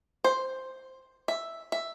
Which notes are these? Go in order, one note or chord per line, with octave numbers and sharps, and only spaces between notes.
C5
E5
E5